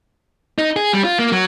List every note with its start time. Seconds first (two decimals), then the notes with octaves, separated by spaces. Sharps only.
0.58 D#4
0.76 G#4
0.93 G3
1.04 F4
1.19 A#3
1.32 F#3